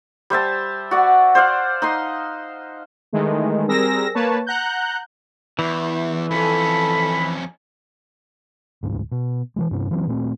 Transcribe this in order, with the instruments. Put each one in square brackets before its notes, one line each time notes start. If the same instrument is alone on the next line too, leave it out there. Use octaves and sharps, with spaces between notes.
[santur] G3 C5 E5 A5
F#4 D5 F#5
C5 D5 F5 F#5
D#4 D#5 C6
[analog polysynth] D#3 E3 G#3 A3
G3 C4 G#4 A#4 E6 A#6
A#3 B4 C#5 A5
F#5 A#5 F#6 G6
[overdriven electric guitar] E2 [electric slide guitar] E3
[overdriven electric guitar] F2 C#4 [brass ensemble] A4 [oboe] B5
[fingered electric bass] E1 D2 G#2
B2
E3 F3 G#3
G2 C3 C#4
E3 F#3 C4
A#2 A3 C4